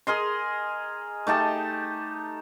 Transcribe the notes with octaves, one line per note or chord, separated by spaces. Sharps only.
G#4 A#4 D#5 C6
A3 D#4 G4 A5